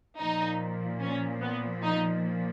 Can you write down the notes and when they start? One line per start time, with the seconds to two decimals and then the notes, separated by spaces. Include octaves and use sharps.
0.19 A#2 F3 D#4
1.01 C#4
1.41 B3
1.83 D#4